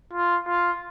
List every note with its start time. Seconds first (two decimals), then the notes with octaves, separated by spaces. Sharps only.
0.13 F4
0.47 F4